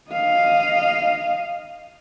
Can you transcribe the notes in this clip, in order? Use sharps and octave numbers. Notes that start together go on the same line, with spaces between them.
D#5 F5